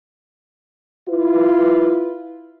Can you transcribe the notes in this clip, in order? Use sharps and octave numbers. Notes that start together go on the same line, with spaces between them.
E4 F4 B4